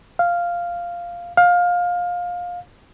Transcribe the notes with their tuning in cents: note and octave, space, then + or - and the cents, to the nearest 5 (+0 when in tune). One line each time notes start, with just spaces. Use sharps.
F5 -5
F5 +20